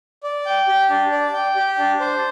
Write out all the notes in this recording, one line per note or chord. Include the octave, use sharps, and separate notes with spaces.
D5
G5
G4
D4
D5
G5
G4
D4
C5